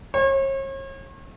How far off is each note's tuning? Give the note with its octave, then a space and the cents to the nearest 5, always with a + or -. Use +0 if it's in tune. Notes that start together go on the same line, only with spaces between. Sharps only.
C#5 -40